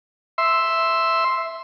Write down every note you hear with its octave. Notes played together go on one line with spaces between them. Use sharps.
E5 C6